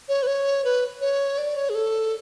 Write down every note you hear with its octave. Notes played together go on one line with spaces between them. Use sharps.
C#5
B4
C#5
B4
C#5
D5
C#5
G#4
A4